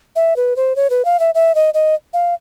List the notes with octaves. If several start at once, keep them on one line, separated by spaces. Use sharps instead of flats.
E5
B4
C5
C#5
B4
F5
E5
E5
D#5
D#5
F5